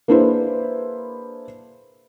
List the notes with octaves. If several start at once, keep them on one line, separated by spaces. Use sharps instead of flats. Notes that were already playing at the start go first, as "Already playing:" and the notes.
A#3 D4 E4 G#4 B4 C5